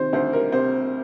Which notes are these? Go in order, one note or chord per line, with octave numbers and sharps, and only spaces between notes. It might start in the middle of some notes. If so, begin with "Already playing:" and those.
Already playing: C3 D#3 C5
D2 C5
A#4
C3 C5